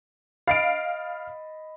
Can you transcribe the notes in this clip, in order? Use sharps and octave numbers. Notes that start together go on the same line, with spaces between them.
D#5 F5 B5 A6 C7 D7